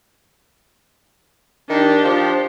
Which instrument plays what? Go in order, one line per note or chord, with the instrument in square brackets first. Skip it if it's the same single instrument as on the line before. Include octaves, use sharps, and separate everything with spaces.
[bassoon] D#3 [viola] D4 G4
[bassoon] F3